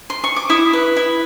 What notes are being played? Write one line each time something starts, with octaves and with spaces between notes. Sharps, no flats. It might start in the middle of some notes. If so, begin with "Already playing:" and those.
C6
C#6
D6
E4 D#6
B4
E4